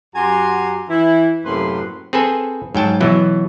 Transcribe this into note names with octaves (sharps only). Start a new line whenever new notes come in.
F#2 F#4 G4 G#5 A#5 C6
E3 E4
F#2 A2 C3 A#3 B4 C6
C4 G#4 A4 B4 G#5
G#2 F#3 G5 A5
B2 E3 F#3